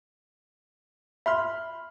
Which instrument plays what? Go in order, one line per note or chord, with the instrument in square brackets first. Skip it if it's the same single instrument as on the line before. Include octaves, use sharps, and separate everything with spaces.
[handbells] E5 [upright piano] B5 C6 F6